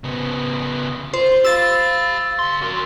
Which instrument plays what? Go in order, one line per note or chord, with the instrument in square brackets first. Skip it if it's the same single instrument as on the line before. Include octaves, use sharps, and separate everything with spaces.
[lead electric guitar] C#3 B3
[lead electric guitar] F4 [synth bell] C5
[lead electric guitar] G4 F5 [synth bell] E6 A6
[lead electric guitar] D2 C6
F#4 A#4